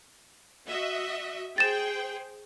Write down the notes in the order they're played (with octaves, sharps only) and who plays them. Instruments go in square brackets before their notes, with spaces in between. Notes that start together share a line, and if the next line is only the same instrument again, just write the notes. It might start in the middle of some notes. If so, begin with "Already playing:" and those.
[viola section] F#4 D#5 E5
[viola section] G#4 C5 G5 [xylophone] A6 E7